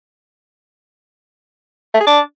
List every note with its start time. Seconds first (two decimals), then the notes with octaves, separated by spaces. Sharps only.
1.94 A3
2.00 G#4
2.06 D4